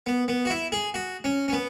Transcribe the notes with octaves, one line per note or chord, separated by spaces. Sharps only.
B3
B3
F#4
E4
G#4
F#4
C#4
C#4
B3